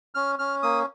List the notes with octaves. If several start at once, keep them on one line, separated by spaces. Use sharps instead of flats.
C#4 F6
C#4 F6
A#3 D#6